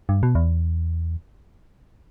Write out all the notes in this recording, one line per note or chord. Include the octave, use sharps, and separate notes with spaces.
G2
B2
E2